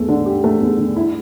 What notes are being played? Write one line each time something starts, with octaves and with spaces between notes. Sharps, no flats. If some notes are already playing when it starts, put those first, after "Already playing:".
Already playing: E2 A3
D3
G4
A3
E2
D3
E4